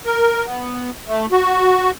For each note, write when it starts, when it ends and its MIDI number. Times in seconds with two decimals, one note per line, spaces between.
0.05 0.46 70
0.46 0.90 59
1.08 1.26 57
1.32 1.91 66